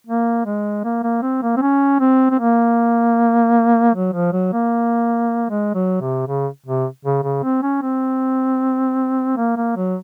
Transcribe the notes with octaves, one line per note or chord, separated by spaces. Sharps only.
A#3
G#3
A#3
A#3
C4
A#3
C4
C#4
C4
C4
A#3
F#3
F3
F#3
A#3
G#3
F#3
C3
C#3
C3
C#3
C#3
C4
C#4
C4
A#3
A#3
F#3